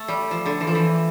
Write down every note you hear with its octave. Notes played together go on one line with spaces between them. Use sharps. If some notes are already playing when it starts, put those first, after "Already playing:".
Already playing: A3
G3
F3
D3
E3
F3
E3